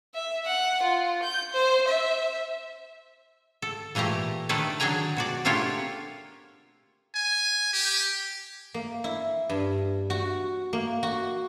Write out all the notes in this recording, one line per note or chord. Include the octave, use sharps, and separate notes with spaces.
E5
F#5
F4
G6
C5
E5
A4
A#2 E3 A3 G4 A#5
D#3 A3 D4 A4 B4 A5
F#3 D4 G#4 G5 G#5 A#5
B2 F#4 D5
A3 A#3 D4 F4 G4 C#5
G#5
G4
A#3
E4
G2
F#4
A#3
F#4